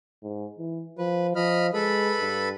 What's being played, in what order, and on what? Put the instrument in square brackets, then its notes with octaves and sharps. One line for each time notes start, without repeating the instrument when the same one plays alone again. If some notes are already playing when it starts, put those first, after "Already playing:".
[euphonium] G#2
E3
[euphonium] F3 [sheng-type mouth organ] B4
[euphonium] F3 [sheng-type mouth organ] D#5 B5 F6
[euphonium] G#3 [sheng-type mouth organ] A4 B4 B5
[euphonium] G2